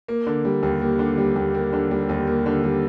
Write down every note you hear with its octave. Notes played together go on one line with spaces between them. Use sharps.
A#3
D3
G3
D#2
A#3
D3
G3
D#2
A#3
D3
G3
D#2
A#3
D3
G3